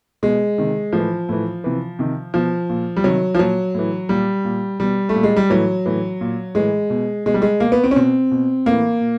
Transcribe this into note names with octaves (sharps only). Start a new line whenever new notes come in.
B2 G#3
C3 D#3
A2 E3 F3
A2 E3
C3 E3
C3 D#3
B2 F3
A#2
G3
C3 D#3 F#3
F3
A#2 F#3
A2 E3
A#2 G3
A#2
B2 G3
A3
A#2
G#3
G3
A2 E3 F#3
A2 E3
A#2
A2 E3 G#3
B2
B2 G#3
G3
G#3
B2 A#3
B3
C4
C#4
B2 C4
B2
A2 E3 A#3
A#2